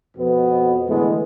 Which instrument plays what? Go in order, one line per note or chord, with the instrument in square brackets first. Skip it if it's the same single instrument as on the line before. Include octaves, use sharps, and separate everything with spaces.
[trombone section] F2 B2 B3
A2 D3 E3 G#3 A3 B3